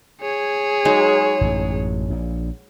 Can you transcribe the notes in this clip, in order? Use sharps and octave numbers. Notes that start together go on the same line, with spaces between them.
G#4 C#5
F#3 G#3 D#4
A1 F#2
A#1 A#2